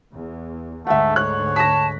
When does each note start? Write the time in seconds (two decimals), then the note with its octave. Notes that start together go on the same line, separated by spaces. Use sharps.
0.11 E2
0.87 D2 G#2 D3 A3 E5 F#5
1.16 C#5 F#6
1.56 A5 A#6 B6